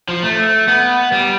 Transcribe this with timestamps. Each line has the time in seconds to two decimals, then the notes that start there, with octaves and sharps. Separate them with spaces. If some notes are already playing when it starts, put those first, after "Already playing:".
0.08 F3
0.23 A3
0.68 B3
1.12 G3